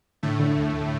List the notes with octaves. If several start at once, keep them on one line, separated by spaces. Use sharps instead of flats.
A2 D3 A3
D3
D2
D2